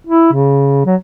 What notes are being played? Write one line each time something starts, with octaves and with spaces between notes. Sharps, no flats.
E4
C#3
F#3